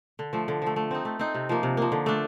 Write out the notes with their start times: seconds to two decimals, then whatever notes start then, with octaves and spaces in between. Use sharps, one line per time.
0.19 D3
0.33 F3 A3
0.48 D3
0.62 F3 A3
0.76 A3
0.91 C4 D#4
1.05 A3
1.19 C4 D#4
1.35 C3
1.49 F3 A#3
1.63 C3
1.77 F3 A#3
1.92 D3
2.06 A3 D4